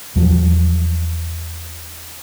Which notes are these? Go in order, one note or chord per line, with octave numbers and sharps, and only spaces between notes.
E2 F3 F#3